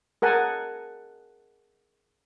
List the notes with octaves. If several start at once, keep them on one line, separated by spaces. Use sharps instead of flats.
G#4 A#4 F#5 G#5 A5